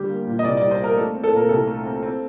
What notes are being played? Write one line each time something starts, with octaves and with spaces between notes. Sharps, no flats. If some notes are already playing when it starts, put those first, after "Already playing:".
Already playing: D2 G3 G4
A#3
A#2
D#5
C2 D5
D5
G3
C5
A#3 A#4
A3 A4
C4
A4
A#2 A#4
C2 A4
A3
C4
C4